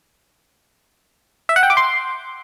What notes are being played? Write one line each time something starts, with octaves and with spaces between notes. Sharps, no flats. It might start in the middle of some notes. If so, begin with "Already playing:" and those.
E5
F#5
G5
D6
C6